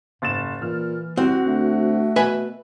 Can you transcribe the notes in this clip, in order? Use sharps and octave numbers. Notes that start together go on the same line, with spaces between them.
F#1 G#2 A6 E7
A#2 E3 F6
C2 C4 F#4
D2 A3
B2 B4 E5 G#5